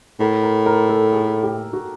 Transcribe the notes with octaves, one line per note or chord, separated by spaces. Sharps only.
A2 A#4
A#4
A#4
A4
G#4
G4
F#4